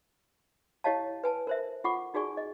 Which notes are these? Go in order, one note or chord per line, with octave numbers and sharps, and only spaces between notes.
E4 G4 C#5 D#5 F5 A5
B4 G#5 A5
A#4 C5 E5
F4 A4 F#5 C#6 D6
D#4 F#4 G#4 D5 G#5 C#6
D#5